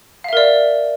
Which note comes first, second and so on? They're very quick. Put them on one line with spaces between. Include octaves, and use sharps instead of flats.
F5 E5 A#4 D5